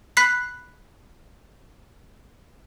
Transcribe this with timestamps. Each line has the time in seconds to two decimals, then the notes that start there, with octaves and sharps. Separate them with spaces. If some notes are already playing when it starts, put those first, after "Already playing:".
0.17 B5 F#6 B6 C7